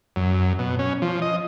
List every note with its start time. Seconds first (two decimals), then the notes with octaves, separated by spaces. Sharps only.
0.16 F#2
0.59 B2
0.79 C#4
1.02 F3
1.22 D#5